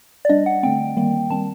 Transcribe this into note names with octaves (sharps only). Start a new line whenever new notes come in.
D5
G3 D4 D#5
F#5
D3 A3 C4 G5
D#3 G3 A#3
D#3 G3 C4 A5